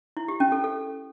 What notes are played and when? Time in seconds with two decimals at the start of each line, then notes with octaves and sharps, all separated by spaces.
0.17 E4
0.28 G4
0.40 C#4
0.52 A4
0.64 A4